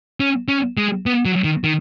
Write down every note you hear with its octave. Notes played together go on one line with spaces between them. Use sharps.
C#4
C#4
G#3
B3
F#3
D#3
D#3